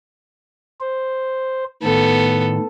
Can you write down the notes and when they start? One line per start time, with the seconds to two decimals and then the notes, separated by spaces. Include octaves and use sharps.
0.80 C5
1.83 A2 D#3 B3 A4